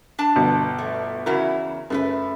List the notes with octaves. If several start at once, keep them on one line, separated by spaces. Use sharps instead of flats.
D4 A5
G1 B2
A3
E2 C#3 E4 F#4 A#4
F#2 C#3 A3 F4 B4